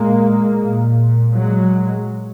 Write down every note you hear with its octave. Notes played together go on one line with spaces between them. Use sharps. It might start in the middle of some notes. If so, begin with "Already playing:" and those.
Already playing: A#2 G#3 A#3
A#2
F#3 G#3